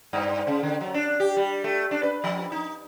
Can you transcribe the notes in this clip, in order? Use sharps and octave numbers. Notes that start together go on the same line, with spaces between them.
G2
C#3
D3
F#3
D4
G4
G3
A3
D4
B4
F3
D#4